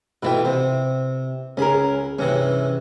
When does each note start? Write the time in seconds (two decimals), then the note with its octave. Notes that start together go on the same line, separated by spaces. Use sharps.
0.23 B2 E3 A3 F4 B4 G5
0.45 C3 C4
1.57 C#2 C#4 G#4 A#4 B5
2.19 G2 C3 E3 C#4 G#4